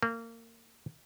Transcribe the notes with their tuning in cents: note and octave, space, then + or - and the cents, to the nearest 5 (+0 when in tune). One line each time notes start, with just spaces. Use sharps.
A#3 -25